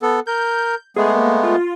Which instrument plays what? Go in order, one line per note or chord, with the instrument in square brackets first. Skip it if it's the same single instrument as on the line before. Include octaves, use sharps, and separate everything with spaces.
[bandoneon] B3 A4
[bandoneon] A#4 [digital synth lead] G6
[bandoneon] G#3 A3 B3 [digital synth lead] G#4
[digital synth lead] A#3
F4